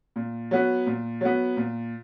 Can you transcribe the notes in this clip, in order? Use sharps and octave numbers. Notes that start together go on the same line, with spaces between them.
A#2
F#3 B3
A#2
F#3 B3
A#2